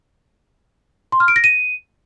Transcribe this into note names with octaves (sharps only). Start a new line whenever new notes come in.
C6
F6
D7
A#6
D#7